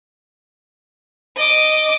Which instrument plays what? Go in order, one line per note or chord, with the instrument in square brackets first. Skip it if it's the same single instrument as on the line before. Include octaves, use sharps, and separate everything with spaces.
[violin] D#5 D6